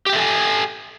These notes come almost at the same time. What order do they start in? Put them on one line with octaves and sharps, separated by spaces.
G4 G5 E5 A4 G#5